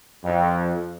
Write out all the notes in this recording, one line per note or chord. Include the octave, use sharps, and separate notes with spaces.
F2